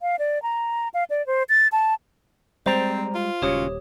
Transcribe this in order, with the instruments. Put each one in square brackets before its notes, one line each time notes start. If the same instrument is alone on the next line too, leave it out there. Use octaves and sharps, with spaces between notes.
[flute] F5
D5
A#5
F5
D5
C5
A6
A5
[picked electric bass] G3 G#3 [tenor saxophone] C4 [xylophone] C5 [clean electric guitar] D5 G5 A#5
[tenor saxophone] F4
[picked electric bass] D#1 [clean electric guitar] C#2 C#4 F#4 [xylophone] G4 C#5 D#6